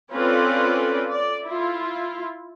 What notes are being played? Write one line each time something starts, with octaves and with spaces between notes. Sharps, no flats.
C4 C#4 F4 A4 B4 D5
D5
E4 F4